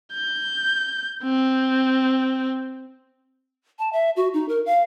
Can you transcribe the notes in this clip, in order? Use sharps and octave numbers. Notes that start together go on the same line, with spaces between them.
G6
C4
A5
E5
F#4
D#4
A#4
F5